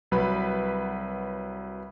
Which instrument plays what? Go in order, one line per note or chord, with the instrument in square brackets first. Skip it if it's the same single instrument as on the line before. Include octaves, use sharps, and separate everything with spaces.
[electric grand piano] C2 F#3 B4 B5